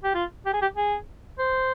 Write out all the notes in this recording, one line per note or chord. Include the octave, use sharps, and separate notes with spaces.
G4
F4
G4
G#4
G4
G#4
C5